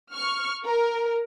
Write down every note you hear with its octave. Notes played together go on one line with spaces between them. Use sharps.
C#6 F6
A#4